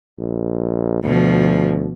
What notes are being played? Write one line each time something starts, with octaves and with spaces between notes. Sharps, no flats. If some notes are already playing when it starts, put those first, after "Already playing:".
A#1
D2 B2 F3